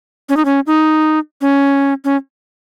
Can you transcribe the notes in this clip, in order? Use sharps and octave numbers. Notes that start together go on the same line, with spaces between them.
C#4
D#4
C#4
D#4
C#4
C#4